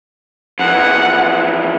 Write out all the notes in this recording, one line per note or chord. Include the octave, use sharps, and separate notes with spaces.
F2 E3 F#5